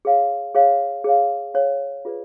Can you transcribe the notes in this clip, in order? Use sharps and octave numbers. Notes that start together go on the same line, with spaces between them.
G#4 C#5 F5
G#4 C#5 F5
G#4 C#5 F5
G#4 C#5 F5
F4 G#4 B4 D5